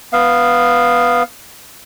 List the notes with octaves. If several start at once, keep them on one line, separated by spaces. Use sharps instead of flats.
B3 F5